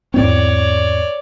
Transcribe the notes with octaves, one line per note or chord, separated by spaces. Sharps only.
E2 G#2 C4 C#5 D5